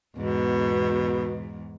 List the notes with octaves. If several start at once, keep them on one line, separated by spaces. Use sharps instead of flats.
E2 G#2 B2